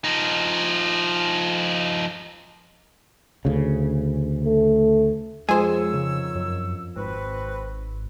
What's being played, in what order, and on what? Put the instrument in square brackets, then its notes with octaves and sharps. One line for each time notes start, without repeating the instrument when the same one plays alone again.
[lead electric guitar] F3 D#4
[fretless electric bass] D2 C#3
[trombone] A3
[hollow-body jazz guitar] F2 C5 [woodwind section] D#3 C#5 E6 [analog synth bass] G#3 [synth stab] G#4
[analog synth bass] C#3
F#2
[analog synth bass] G#1 [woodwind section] C4 F#4 B4